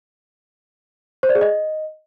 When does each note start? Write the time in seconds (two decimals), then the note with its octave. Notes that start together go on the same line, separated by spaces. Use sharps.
1.23 C5
1.29 D5
1.35 G#4
1.41 D#5